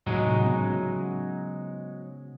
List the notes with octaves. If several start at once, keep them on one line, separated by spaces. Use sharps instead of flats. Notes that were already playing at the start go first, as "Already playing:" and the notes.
A2 C3 F#3 G#3 D#4
C#3 B3 C#4